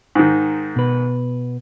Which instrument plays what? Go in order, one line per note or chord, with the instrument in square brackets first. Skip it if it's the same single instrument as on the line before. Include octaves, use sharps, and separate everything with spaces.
[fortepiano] G#2 D#3
[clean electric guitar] B2 B4